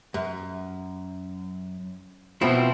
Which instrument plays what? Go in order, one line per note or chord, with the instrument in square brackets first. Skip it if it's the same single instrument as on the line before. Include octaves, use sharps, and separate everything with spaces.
[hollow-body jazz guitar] F#2
[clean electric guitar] B2 C4 E4 [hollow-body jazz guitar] F3